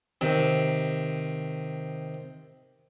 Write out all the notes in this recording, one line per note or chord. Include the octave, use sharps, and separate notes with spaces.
C3 D#3